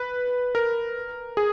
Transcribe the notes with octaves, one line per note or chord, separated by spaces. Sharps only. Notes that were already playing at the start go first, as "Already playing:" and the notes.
Already playing: B4
A#4
G#4